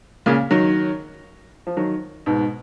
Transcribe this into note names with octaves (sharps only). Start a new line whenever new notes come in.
A#2 C#3
D#3 F#3
F3
D#3 F#3
G#2 B2